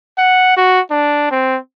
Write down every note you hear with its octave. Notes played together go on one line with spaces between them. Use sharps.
F#5
F#4
D4
C4